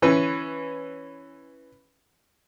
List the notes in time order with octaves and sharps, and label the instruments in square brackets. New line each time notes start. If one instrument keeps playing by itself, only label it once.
[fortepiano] E3 C#4 B4